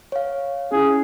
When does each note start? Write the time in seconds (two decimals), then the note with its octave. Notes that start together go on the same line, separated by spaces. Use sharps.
0.12 C#5 F5
0.72 C#4 E4 G#4